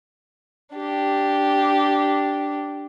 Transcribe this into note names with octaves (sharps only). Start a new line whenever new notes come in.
D4 G4